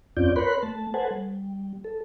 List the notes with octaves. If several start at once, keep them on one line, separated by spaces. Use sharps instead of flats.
F2 C4 C#4 F4 D5 G6
A#4 B4 C#5 B5 C6 F#6
A3 A5
A4 B4 C5 F#5 G#5 A5
G3
A4